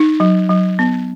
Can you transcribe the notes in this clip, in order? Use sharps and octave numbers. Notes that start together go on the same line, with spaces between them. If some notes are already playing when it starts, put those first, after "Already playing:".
Already playing: D#4
F#3
F#3
B3